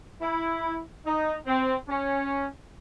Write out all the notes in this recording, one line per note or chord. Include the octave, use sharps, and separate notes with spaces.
E4
D#4
C4
C#4